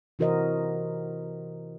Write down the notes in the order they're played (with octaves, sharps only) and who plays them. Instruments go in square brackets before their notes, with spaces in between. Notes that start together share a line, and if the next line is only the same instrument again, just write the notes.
[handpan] C3 E3 F#4 A#4 C5 D#5